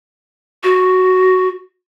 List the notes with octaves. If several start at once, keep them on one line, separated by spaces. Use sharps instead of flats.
F#4